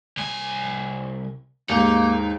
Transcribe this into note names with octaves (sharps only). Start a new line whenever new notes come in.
C2 G#5
D#2 G#2 A#3 D#4